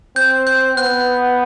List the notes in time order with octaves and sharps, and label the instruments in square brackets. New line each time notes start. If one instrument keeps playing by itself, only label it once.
[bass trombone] C4 [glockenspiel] G6
[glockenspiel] G6
[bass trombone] B3 [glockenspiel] F#6